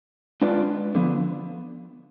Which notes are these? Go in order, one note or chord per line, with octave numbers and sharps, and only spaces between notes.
G#3 D4 F4 B4 D5
D3 F3 B3